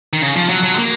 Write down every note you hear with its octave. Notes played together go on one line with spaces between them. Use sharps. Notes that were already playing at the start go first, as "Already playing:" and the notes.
D#3
C#3
F3
F#3
F#3
G#3
A#3